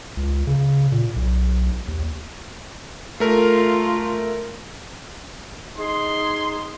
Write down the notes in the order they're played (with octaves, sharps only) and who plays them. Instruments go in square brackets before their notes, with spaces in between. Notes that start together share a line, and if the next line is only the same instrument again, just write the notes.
[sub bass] C#2
C#3
A#2
B1
D#2
[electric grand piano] A3 A#4 [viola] F4
[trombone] D#4 [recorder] G#4 [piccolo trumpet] C6